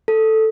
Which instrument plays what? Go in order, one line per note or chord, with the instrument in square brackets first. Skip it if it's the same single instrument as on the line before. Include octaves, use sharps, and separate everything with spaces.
[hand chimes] A4